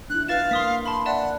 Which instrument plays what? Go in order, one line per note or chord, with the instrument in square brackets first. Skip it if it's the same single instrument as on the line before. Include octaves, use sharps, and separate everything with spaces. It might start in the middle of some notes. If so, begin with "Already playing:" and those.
[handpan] D4 E4 [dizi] F#6
[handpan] F4 [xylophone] B4 A6 E7 [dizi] F5
[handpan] A#3 [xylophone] C6 D#6 B6
[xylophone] A5 B5 [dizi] C6
[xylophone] D5 E5 A5 [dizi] F#5